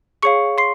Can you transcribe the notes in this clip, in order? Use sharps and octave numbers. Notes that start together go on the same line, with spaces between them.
G#4 C#5 F5 C#6 C#7
C6 C7